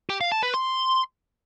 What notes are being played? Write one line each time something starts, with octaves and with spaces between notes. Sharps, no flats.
G4
F5
A5
B4
C6